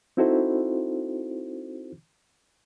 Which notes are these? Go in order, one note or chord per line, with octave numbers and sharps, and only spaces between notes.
C4 D#4 E4 F#4 A4 C5